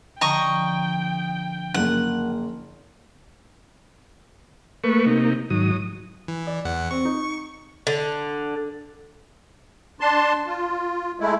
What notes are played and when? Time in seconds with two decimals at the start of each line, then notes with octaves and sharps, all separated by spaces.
0.21 D3 F3 D#5 G5 A#5 C#6
1.74 F#1 A#3 F#5
4.84 A3 A#3 B4 C#6
5.06 C3 D#4
5.50 G#2 D#3 F#3 D#6
6.28 E3
6.47 D5
6.65 E2 F#5
6.91 C4 C#6
7.05 D#4
7.87 D3
10.00 D4 A5 C6
10.47 F4
11.20 G#3 A3 E4